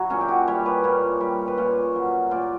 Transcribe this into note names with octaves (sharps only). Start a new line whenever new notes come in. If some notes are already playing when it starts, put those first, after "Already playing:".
Already playing: F#3 E4 F#4
A#2 C#4
G4
F#4
G3 C#5
B4
A#2 C#5
G3
B4
A#2 C#5
F#3
A#2 D5